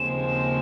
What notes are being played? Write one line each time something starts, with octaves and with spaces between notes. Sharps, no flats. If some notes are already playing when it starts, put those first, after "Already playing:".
Already playing: D#2 C#3 F3 G#3 C4 E7